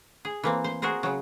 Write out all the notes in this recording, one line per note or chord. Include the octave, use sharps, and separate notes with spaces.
G#4
E3 A#3 C4
C5
F#4 G#4 A#4 C5
C#3 F#3